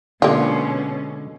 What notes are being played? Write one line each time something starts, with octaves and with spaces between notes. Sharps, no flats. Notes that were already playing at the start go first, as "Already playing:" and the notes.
B2 D3 G#3 A#3 C#4 F4